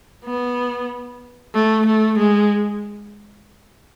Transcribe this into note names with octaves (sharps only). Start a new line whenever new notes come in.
B3
A3
A3
G#3